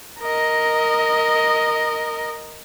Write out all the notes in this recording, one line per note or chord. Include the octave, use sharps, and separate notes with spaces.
A#4 D#5